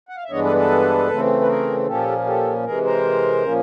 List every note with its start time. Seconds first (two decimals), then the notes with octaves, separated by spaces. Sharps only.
0.09 F#5
0.16 F5
0.24 E5
0.30 G2 E3 G#3 B3 D4 C#5 D#5
0.44 A4 B4
0.56 A4 B4
1.09 C#3 E3 A3 C4
1.41 B4
1.48 G#4 A#4
1.86 A#2 F3 A#3 C#4 G4 A4
2.26 G4 A4
2.65 C3 E3 G#3 G#4 A#4
2.85 A#4 C5
3.43 A#2 F3 A#3 C#4